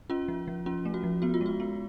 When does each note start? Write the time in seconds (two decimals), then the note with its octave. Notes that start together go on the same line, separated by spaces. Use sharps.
0.10 C#4 F4
0.28 F3
0.48 F3
0.66 C#4 F4
0.85 A3
0.94 F#4
1.03 F3
1.22 B3 F#4
1.34 F4
1.41 G#3 F#4
1.60 B3